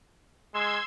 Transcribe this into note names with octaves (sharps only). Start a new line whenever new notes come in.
G#3 C6 E6 G#6